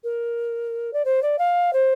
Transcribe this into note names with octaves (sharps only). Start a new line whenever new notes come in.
A#4
D5
C5
D5
F5
C5